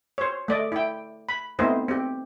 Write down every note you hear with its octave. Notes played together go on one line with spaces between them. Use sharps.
C5 C#5
A3 D5 D#5
E4 G5
B5
A3 B3 C4 D#4 E4 C5
C4 G4